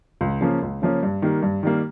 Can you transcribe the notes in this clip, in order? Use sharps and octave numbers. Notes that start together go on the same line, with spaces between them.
C#2
C#3 F3 A#3 C#4
C#2
C#3 F3 A#3 C#4
G2
D#3 G3 A#3
G2
D#3 G3 A#3